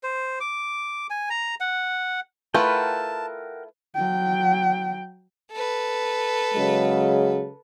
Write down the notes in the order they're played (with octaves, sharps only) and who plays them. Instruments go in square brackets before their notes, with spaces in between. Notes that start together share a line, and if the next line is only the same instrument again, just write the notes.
[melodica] C5
D6
G#5
A#5
F#5
[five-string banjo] A3 E4 F4 [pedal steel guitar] A#4 F#5 G5 [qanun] B4 [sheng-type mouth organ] A5
[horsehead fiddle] F#3 G5
[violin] A4 B4
[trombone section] C#3 F#3 G#3